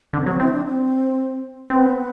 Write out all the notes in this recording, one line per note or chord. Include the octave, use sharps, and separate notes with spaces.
D3 C4
F#3 C4
C4 E4
D4
C4
B3 C4